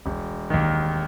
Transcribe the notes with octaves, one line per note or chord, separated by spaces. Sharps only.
E1
D#2 D#3